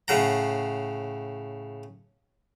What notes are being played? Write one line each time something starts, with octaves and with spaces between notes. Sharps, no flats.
A2 C#3 F#5 A#5